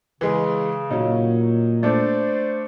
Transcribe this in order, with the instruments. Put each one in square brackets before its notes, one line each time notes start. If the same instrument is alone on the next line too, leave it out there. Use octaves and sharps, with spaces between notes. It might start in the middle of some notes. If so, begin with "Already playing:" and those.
[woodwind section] C#3 [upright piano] E3 G#3 G#4
[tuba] A#2 [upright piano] F#3 C#4 D#4
[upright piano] A3 D4 [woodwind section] C5 D5